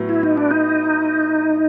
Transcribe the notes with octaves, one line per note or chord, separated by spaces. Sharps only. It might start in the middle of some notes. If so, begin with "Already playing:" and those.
Already playing: A2 F#3 B3
E4
D#4
D4
D#4